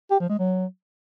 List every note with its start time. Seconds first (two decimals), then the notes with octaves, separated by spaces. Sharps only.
0.11 G4
0.20 F3
0.30 G#3
0.39 F#3